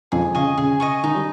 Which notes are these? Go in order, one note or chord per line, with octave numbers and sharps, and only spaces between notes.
F2 F3 G#4
C#3 D#5 G#5 C#6
C#3 G#4
D#5 G#5 C#6
D#3 D#4
G3